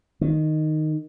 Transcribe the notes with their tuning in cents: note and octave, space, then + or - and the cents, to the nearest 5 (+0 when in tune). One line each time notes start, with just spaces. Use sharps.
D#3 -5